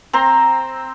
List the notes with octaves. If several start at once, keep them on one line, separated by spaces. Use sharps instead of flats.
C4 A#5 C6